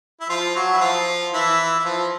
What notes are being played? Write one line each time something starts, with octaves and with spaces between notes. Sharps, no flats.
E4
F3 F4
F#3 F#4
E4
F3 F4
E3 E4
E4
F3 F4